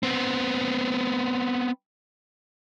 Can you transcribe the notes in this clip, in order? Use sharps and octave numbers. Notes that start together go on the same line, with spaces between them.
B3 C4